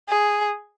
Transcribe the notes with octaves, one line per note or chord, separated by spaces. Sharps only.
G#4